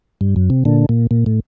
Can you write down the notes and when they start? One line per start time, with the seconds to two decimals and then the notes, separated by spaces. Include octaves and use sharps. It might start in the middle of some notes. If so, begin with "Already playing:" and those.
0.21 G2
0.36 F#2
0.50 C3
0.65 A#2 D3
0.89 A#2
1.11 A#2
1.26 A2